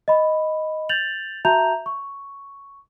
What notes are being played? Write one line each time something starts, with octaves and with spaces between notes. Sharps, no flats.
D#5 B5
G6 A6 F7 F#7
F#4 E5 A5 A#5 G6 F7
C#6